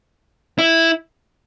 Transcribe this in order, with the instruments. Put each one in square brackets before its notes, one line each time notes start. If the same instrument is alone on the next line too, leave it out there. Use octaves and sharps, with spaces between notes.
[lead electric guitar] E4